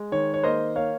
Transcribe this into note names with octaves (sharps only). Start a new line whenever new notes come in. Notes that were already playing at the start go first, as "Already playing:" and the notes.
Already playing: G#3
D#3 C#5
C#5
A#3 C5 D#5
A#3 C#5 F5